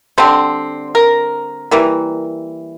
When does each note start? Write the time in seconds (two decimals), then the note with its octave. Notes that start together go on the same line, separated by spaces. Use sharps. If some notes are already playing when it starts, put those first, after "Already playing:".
0.18 D3 G3 C4 C5
0.95 A#4
1.71 E3 G3 A#3